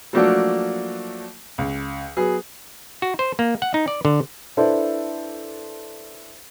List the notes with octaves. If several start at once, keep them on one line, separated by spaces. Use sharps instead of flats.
F3 F#3 A3 A#3 D4 F#4
C#2
F#3 B3 G#4
F#4
C5
A#3
F#5
D#4
D5
D3
D4 E4 A4 B4 C5 D5